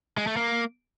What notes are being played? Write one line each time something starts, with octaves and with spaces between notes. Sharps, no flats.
G#3
A3
A#3